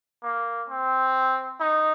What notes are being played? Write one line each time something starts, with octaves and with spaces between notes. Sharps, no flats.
A#3
C4
D#4